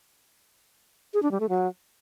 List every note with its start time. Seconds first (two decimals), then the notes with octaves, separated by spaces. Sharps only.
1.14 G#4
1.23 D4
1.31 G3
1.40 A3
1.49 F#3